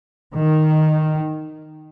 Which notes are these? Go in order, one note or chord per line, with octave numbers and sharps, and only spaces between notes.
D#3